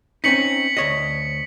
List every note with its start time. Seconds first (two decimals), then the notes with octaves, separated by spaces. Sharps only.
0.24 C4 C#4 D#4 B6 C#7 F#7
0.77 D2 C#5 D#5